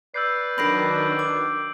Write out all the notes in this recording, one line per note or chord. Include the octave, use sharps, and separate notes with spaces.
B4 D5 E6 G6 C7
D#3 F#3 D4 B5 A#6 C7 D7 F#7
D6